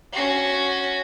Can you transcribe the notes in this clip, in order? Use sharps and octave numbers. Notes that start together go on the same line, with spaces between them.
C#4 F#4